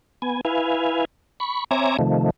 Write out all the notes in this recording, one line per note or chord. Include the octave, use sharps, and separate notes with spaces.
B3 G#5
E4 B4 F5 G#5
B5 C#6
C4 C#5 E5 G#5 A#5 D6
C3 D#3 F3 A3